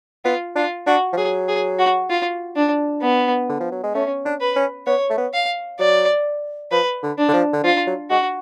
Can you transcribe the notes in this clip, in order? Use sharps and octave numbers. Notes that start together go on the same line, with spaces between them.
B3 F4
D4 F4
D4 F#4
F3
F#3 G#4
G#4
F#4
F4
D4
B3
D3
F3
F#3
G#3
A3 C#4
D4
B4
C#4
B3 C#5
A3
B3
F5
F#3 D5
F3 B4
D3
D4
D3
F3
D3
F3 F4
F#3
G#3 F#4